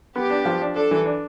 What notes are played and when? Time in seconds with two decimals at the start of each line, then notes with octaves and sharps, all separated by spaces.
0.16 B3 G4
0.30 D4
0.45 F3
0.61 D4
0.75 D4 A4
0.91 E3
1.06 D4